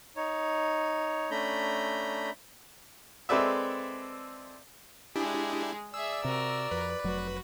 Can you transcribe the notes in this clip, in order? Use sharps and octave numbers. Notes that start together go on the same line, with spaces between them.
D#4 C#5
A3 C#4 D4 A#5 B5 G6
G#3 C4 A4 B4 D5 E5
G#3 D4 E4 G4 G#4
G#4 D5 E5 E6
C3 F#4 A#4
F2 B4
F1 F#3 F#4